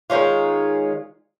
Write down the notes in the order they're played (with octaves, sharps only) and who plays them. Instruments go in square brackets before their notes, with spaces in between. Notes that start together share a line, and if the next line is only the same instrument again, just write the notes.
[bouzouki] D#3 G#3 C#4 F4